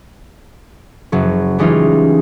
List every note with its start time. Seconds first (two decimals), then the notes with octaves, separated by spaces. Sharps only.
1.12 F#1 F#3
1.58 E3 G3 G#3 C#4 D#4 F4